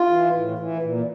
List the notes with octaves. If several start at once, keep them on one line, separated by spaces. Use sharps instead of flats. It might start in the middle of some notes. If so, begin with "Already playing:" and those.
Already playing: F4
E3
A2
E3
A#2